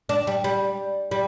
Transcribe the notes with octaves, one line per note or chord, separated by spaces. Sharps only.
D4
G3
G3
G3